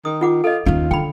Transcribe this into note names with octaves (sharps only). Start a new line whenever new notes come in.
D#3 D#6
F4 F#5 D6
F4 A4 D#5
D#2 C#4 F4
D3 G5 B5